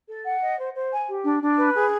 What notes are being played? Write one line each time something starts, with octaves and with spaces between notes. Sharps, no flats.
A4
F#5
D#5
C5
C5
G#5
G4
D4
D4
B4
G#4